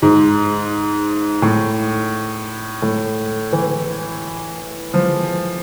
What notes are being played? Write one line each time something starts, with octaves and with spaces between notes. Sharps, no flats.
G#2
A2
A2
E3
F3